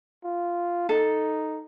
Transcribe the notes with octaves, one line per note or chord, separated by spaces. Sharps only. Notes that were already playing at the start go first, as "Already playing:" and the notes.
F4
D#4 A4